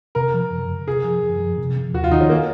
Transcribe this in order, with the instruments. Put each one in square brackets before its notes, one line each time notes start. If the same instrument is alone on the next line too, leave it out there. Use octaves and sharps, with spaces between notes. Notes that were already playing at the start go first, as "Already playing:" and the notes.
[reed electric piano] C3 [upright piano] A#4
[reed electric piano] F3
F#2
C#3
[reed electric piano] C3 [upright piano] G#4
[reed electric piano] F3
F#2
F3
C3
F3
[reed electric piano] D#2 [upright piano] F#4
[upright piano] F4
[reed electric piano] D#3 [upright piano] D#4
[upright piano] C#4
A#3